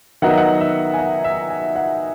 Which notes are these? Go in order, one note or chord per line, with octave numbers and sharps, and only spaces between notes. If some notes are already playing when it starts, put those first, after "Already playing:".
D#3 F#3 B3 D#4 F#5
E5
F#5
E5
G#5
F#5
E5
G#5
F#5